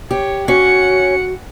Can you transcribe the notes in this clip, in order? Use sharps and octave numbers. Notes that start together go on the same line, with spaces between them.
G4 C#5
C#4 F#4 F#5 C#7